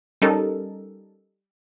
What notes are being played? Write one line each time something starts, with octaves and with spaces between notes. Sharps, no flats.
G3 C#4 D#4 A4 A#4